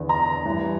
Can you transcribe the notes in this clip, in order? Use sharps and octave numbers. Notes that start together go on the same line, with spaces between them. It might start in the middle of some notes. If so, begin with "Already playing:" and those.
Already playing: E2 D3
A#5
G2 E3